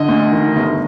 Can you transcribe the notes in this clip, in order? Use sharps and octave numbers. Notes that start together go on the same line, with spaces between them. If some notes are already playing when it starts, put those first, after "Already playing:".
Already playing: D3 D#5
D2
D#3
G1